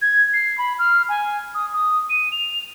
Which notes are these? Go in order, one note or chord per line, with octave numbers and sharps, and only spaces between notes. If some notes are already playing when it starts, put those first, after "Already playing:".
G#6
C7
B5
F6
G#5
D#6
D#6
D#7
F7